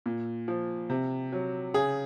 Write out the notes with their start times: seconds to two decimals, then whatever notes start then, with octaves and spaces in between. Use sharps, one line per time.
0.06 A#2
0.48 F3
0.90 C3
1.32 F#3
1.74 C#3 G#4